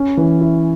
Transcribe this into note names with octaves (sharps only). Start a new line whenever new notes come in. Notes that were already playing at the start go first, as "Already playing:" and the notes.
Already playing: C#4
E3
E4